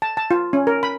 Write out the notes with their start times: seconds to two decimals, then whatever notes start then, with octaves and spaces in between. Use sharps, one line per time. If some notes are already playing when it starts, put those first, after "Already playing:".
0.02 A5
0.17 A5
0.31 F4
0.53 C#4
0.67 A#4
0.83 B5